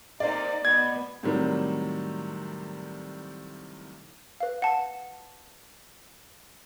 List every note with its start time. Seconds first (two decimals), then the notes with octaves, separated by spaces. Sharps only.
0.20 C3 A#3 D#4 D5
0.65 B2 B3 G#6
1.23 A2 C3 D#3 F#3 G3
4.40 B4 F5
4.62 F#5 A5